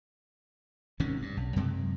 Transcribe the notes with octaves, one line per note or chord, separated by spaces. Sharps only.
G#1 C3 D#3 C#4
G2
B1
F#2 C3 F#3 G#3